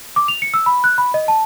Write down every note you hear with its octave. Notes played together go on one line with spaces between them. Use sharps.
D6
F7
C#7
E6
B5
F#6
B5
D#5
A5